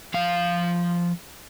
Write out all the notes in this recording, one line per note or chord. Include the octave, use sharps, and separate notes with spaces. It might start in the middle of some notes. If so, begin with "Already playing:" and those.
F3 F5